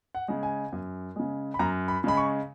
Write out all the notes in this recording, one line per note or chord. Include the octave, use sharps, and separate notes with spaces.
F#5
C#3 G#3
G#5
F#2
C#3 G#3
B5
F#2 A#5
B5
C#3 G#3 B5
C#6